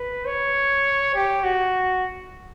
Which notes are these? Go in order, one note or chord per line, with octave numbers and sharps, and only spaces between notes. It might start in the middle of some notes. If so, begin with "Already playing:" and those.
Already playing: B4
C#5
G4
F#4